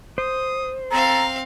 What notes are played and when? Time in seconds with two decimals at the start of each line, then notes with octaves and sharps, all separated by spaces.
0.18 C5 D#6
0.91 C4 A4 F5 A#5